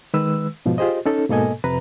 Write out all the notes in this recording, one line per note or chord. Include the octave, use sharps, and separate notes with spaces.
D#3 G#3 B4 E6
G#2 B2 F3
F4 G4 G#4 C5 D#5
C#4 D#4 A4
G#2 B2 A#3 A4 D#5 G#5
F2 C3 B4 A#5